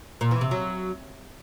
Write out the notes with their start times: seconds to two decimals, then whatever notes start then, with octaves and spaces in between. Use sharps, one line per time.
0.21 A#2
0.31 E3
0.41 C3
0.51 F#3